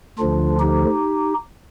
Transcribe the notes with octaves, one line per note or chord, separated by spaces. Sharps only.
D2 D3 F3 D4 F4
D#4 G4